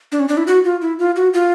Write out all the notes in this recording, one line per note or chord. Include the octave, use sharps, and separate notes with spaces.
D4
C#4
D4
E4
F#4
F4
E4
F4
F#4
F4